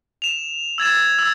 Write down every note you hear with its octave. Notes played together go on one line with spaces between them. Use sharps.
E7 F7
E6 G#6 A6 E7
E6